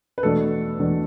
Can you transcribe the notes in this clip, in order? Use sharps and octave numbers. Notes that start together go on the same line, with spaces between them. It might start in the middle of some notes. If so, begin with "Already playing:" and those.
B4
E2 B2 A3 D4 A4
E2 B2 A3 D4